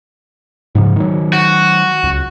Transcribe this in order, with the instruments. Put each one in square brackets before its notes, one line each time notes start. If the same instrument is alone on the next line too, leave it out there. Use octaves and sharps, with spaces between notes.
[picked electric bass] G#2 C#3 F3
D#3 F#3
[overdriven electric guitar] F#4
[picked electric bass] C#2